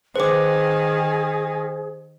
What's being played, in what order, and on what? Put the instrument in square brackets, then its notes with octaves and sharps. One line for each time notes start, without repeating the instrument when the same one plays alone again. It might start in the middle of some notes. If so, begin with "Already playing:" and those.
[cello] D#3 [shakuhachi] G#4 [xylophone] B4 D6 [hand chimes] C5